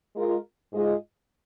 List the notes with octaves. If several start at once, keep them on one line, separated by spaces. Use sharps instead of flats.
G#3 F4 A#4
G#2 G#3 F4 G#4 D#5